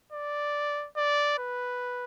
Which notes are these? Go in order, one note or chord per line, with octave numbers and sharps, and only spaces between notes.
D5
D5
B4